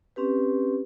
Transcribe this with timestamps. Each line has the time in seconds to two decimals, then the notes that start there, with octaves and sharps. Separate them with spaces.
0.16 C4 C#4 G4 B4